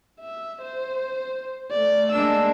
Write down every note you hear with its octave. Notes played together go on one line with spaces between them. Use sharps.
E5
C5
A3 D5
G#3 A#3 D4 E6